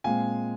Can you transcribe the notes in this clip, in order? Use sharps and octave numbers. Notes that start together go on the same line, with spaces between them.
A#2 G#3 C4 F5 G#5